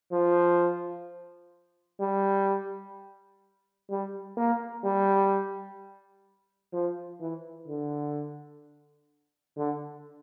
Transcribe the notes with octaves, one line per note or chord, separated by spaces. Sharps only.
F3
G3
G3
A#3
G3
F3
E3
D3
D3